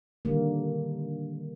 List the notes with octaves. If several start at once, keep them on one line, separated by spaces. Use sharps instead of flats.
D3 D#3 G3 A#3